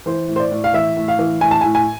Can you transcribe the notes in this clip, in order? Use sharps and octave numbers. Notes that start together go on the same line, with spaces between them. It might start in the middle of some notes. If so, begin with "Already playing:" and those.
E3 C5
A2
C5
D5
A2
F5
E3 E5
A2
F5
E3
A2 G#5
A5
A2 G#5
G#5